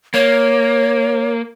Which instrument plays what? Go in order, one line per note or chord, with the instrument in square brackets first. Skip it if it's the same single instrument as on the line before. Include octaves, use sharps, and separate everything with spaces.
[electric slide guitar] A#3 [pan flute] C#5